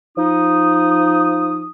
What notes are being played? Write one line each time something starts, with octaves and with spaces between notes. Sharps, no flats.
F3 D#4 D#6